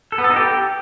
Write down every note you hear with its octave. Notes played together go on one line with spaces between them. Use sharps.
A4
B3
A4
D#4
G4